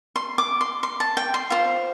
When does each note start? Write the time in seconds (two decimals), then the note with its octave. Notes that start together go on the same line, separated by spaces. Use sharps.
0.16 C6
0.38 D6
0.61 C6
0.83 C6
1.00 A5
1.17 G5
1.34 C6
1.50 F4 C5